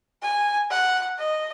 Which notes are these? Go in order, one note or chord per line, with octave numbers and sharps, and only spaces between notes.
G#5
F#5
D#5